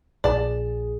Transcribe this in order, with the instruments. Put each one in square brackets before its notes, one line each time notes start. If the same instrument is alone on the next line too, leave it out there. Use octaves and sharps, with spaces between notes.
[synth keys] A#1 A#2 G#4 [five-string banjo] D5 A5